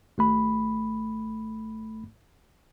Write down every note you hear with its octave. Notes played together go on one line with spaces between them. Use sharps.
G#1 A3 B5